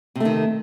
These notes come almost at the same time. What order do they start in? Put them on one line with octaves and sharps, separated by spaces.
C3 A3 D#3